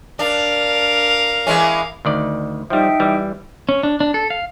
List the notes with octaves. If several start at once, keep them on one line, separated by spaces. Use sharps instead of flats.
D4 A#4 F5
E3 G#3 C#4
D2 D#3 D5
F3 G3 D#4 E5 G5
E3 G3
C#4
D4
D4
A4
F5